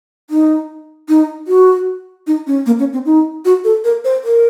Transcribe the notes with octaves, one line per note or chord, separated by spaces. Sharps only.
D#4
D#4
F#4
D#4
C#4
A#3
C#4
C4
D#4
F#4
A4
A#4
C5
A#4